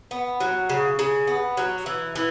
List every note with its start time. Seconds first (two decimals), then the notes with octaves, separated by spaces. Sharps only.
0.11 B3
0.40 F#3
0.70 C#3
0.99 C#3
1.27 B3
1.57 F#3
1.86 E3
2.16 E3